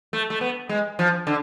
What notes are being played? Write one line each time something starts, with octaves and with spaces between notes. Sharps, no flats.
A3
A3
B3
G#3
F3
D3